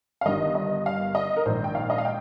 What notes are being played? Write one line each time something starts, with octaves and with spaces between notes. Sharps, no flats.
F5
G1 G2 D#3 D#5
D#5
F5
D#5
A#4
A#1 G#2 D#3 C5
G5
F5
D#5
F5
G5